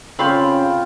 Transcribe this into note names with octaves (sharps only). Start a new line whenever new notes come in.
C#3 C4 F4 F5 G5 B5 C#6